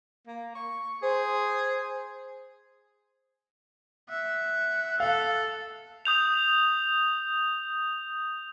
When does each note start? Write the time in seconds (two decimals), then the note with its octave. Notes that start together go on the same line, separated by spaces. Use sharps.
0.27 A#3
0.55 C#6
1.02 G#4 C5
4.09 E5 F#5
5.00 A4 F5
6.05 D#6 G6 F7